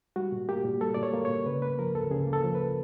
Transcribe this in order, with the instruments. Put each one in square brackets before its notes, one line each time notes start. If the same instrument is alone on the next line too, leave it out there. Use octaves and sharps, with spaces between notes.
[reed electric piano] G3 F#4
A#2
A#3 G4
A#2
G3 A4
A#2 D5
C#5
A#3
A#2 C#5
C#3 B4
A#3 B4
F3 A#4
D2 A4
C#3 G#4
A#3
A4
F3
B4